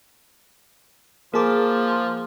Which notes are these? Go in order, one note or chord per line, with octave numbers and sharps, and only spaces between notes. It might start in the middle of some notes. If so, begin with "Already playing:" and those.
F3 A#3 G#4 A#4 A5 D6